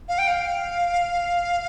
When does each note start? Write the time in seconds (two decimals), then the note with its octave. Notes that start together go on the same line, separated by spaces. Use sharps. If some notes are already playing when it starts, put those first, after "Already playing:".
0.09 F5
0.18 G5
0.28 F5